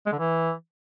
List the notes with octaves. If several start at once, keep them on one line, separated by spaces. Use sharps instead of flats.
G#3
D3
E3